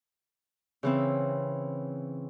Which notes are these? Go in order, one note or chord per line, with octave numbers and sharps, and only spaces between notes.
C#3 E3 C4